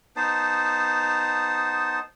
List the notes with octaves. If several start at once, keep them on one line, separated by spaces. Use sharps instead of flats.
B3 D#4 C5 A5